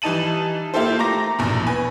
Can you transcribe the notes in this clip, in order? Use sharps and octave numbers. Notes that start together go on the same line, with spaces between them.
E3 G3 D#4 A5 D#7 F#7
A#3 E4 F4 G4 A4 C5
A3 A#5 D6 A#6
A#1 E2 B2
B4 G#5